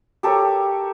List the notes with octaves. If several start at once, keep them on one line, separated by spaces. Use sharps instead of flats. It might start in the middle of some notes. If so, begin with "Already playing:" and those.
G4 A4 A#4 C#5